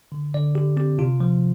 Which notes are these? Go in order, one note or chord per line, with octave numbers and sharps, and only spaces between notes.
D3
D3 D5
D3 G4
C4 G4
C3 F4
F3